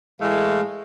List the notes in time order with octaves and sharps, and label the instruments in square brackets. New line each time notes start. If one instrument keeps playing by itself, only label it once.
[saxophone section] A2 A3 [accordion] E3 F5 [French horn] G#3